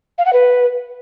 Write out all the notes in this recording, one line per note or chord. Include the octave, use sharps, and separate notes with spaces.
F5
F#5
B4